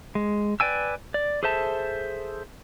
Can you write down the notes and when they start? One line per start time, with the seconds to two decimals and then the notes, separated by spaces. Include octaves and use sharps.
0.15 G#3
0.60 B4 D5 G5 G#5 E6
1.14 D5
1.43 G#4 A4 C5 E5 A5